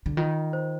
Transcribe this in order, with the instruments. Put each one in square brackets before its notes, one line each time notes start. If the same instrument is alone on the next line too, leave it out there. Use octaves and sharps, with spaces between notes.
[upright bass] D3
[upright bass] D#3 [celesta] F4
[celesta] C5